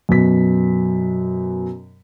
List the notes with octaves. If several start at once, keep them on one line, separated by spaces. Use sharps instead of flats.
F#2 B2 B6